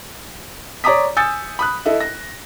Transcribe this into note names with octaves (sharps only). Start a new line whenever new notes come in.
C#5 D5 A#5 D6 D#6 B6
G#5 D#6 E6 G6 A6 C#7
B5 D#6 F#6
E4 A4 D#5 E5
A#6